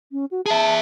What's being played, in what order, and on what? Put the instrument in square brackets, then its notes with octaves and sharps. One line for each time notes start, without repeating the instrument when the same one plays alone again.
[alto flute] C#4
F#4
[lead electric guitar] G#4 E5 [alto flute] A5